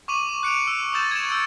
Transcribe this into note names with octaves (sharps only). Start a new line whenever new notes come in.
C#6 D6 D#7 F#7
F#6 C#7 D7 F7
E6
C#6 D#6 E6 G6 A6 E7
G#6 E7
E6 G6 C#7